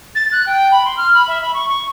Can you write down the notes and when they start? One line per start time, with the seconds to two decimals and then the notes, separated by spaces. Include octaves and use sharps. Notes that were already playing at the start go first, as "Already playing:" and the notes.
0.15 A6
0.32 F#6
0.46 G5
0.72 B5
0.85 C6
0.97 F6
1.14 B5
1.28 E5
1.42 B5
1.54 C#6
1.69 C#6